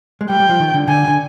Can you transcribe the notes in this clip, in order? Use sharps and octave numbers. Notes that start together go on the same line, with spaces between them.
G#3
G3 G5
G3
F3
D#3
D3
D3 G#5
D3